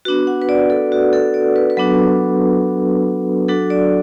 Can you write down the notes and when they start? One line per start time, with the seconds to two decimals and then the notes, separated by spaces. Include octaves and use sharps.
0.05 B3 D4 F#4 B4
0.27 F#5
0.42 B4
0.49 D5
0.70 A4
0.92 F#4
1.13 A4
1.34 D5
1.56 B4
1.70 B4
1.77 F#3 B3 D4 F#4 A4
3.49 F#3 D4 F#4 A4
3.70 D5